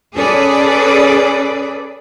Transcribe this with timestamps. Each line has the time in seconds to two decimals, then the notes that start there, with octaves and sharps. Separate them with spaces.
0.15 C#4 G#4 A4 B4 D5